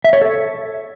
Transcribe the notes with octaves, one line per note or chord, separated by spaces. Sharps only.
E5
C#5
A4